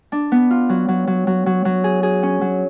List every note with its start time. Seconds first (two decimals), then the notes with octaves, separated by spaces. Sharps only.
0.12 D4
0.32 B3
0.50 F4
0.69 F#3
0.88 F#3
1.07 F#3
1.27 F#3
1.46 F#3
1.65 F#3
1.84 G#4
2.03 G#4
2.23 C#4
2.41 F#3